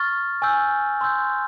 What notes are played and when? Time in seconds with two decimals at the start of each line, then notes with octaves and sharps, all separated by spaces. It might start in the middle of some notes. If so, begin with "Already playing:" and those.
Already playing: C#6 F6 A6
0.42 G#5 C#6 E6 G6
1.01 C6 E6 G6